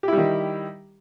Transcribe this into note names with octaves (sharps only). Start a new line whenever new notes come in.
D#3 G3 E4 G4